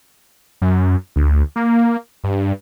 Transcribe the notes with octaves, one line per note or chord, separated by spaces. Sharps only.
F#2
D2
A#3
G2